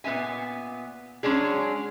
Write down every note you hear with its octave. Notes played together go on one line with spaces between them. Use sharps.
A#2 B3 C4 E5 G#5
F#3 G#3 C#4 D4 G#4